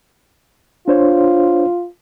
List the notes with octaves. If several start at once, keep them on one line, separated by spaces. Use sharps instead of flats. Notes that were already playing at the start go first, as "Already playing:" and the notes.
D4 F4 C5 C#5